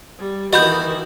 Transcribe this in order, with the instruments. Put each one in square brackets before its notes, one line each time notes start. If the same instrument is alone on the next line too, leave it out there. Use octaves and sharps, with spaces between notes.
[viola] G3
[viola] D#3 E3 [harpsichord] F#4 [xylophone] D#5 B5 G6